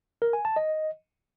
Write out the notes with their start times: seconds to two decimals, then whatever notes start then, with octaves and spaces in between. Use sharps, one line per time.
0.22 A#4
0.33 G#5
0.45 A5
0.56 D#5